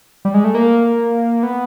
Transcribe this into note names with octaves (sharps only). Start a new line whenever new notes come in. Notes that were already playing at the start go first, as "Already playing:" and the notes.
G3
G#3
A3
A#3
B3